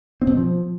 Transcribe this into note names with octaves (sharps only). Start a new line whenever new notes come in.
C4
B2
C4
F3